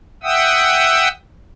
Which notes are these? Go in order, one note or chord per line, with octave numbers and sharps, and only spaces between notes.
E5 F#5 G5 D#6 E6